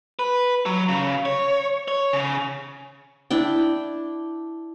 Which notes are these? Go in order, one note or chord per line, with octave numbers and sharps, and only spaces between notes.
B4
F#3
C#3
C#5
C#5
C#3
D4 E4 G5